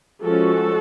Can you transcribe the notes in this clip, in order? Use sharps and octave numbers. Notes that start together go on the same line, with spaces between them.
F3 G#3 C#4 F#4 A4